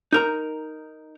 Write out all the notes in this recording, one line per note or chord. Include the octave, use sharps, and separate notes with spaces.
D#4 A#4 A#5